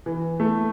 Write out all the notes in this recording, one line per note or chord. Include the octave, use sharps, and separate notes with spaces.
E3
A3